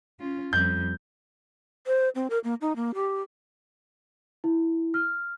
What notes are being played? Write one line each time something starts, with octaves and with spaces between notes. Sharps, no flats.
C#4 F4
F2 G3 G6
C5
C4
A#4
A#3
D#4
A#3
G4
E4
F6